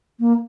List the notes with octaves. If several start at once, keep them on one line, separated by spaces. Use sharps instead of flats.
A#3